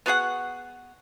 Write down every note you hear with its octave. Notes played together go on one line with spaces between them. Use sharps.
B3 F#4 G#4 F#5